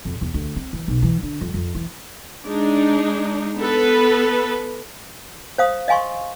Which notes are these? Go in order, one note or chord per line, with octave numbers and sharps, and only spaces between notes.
F2
E2
D2
C4
E3
B1
E3
D3
F2
F2
E3
G#3 D4 D#4
B3 A4 B4
C5 F5 D#6
D#5 F5 G#5 C6 C#6